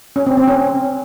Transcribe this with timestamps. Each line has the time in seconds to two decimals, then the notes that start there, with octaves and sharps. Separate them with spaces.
0.16 C#4
0.27 C4
0.37 C4
0.48 C#4